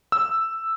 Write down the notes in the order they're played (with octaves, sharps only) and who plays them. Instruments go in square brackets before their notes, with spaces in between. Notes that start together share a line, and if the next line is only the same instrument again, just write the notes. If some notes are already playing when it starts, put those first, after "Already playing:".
[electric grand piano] E6